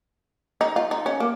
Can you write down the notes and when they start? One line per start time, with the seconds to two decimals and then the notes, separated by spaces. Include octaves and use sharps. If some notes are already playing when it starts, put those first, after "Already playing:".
0.61 D#4
0.76 F4
0.91 D#4
1.06 C#4
1.20 A#3